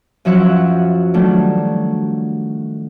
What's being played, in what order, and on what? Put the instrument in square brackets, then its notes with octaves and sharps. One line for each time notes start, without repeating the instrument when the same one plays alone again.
[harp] F#2 F3 F#3 E5 F#5 F#6
D#3 F#3 G3 A3 D4